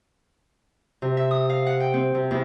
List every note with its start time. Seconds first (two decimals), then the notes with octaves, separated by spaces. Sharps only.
1.02 C3
1.17 E5
1.31 D#6
1.50 F5
1.66 F#5
1.80 G5
1.94 C4
2.15 C3
2.31 E2